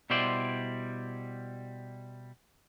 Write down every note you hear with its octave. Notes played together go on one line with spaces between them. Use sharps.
B2 G3 E4 C5 D5 C6